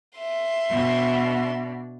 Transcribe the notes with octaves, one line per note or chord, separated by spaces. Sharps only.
E5 C6
B2 D4